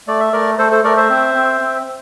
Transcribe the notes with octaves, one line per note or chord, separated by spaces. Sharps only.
A3 D5
E5
A3 A#4 D5
A3 A4 C5
A4 C5
A3 A#4 D5
C5 E5
C4
C4
C4